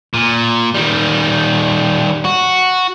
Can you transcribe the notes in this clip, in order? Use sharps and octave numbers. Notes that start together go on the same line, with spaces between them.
A#2
D#3 G3
F#4